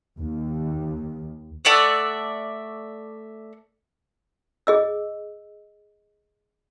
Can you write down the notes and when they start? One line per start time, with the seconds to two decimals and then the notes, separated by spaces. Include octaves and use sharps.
0.20 D#2
1.65 A3 D5 E5 F#5
4.67 G#4 D#5 E6